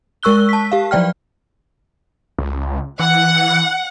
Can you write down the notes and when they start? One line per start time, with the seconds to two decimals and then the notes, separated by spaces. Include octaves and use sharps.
0.23 G#3 A#4 C#6 E6 F#6 G7
0.49 A5 B6
0.72 G4 F5
0.91 F3 F#3 D5 G5 F6
2.39 C#2
3.00 E3 F#5